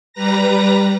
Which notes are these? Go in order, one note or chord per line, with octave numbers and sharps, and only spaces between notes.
G3 B4 A#5 A#6